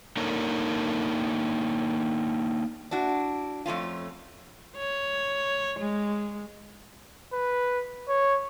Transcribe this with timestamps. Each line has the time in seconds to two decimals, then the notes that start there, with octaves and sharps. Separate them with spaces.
0.17 A#3 D4 D#4 A4 A#4 C#5
2.91 D4 E4 F#4
3.66 F2 A3 C#4 F4
4.77 C#5
5.79 G#3
7.33 B4
8.08 C#5